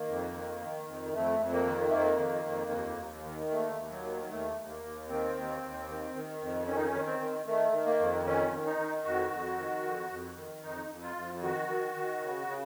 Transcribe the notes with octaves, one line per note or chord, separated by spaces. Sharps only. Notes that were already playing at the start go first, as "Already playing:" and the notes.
Already playing: D#3 A#3
F2
D#3
D#3
F2
F2 A3
F2
A#3
D#3
A3
F2 A#3
D#3
F2
D#2
D#2
D#3
D#2 A3
D#2
F#3
D#3
F#3
D#2 A3
D#2
A#3
D#2
D#3 C4
D#2
D#2
D#3
D#3
F2
D#3 C#4
D#4
C#4
D#3
C4
D#3
D#3 A3
D#3
A#3
F2
D#3 C#4
D#3
D#4
D#3
F2 F#4
F2
D#3
F2
F2
D#3
F2 D#4
F2
F4
F2
D#3 F#4
D#3
D#3
C#3
C#3